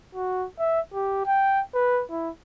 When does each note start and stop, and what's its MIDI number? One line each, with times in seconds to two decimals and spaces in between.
0.15 0.46 66
0.59 0.80 76
0.94 1.25 67
1.26 1.62 79
1.74 2.03 71
2.11 2.30 64